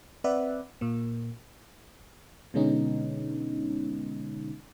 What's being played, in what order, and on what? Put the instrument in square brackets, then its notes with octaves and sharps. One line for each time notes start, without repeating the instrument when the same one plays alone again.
[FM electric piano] C4 B4 D5 E5 F#5
A#2 A#3
B2 D3 G#3 B3 C#4 D#4